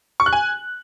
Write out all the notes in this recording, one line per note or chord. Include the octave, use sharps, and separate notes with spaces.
C#6
F#6
G#5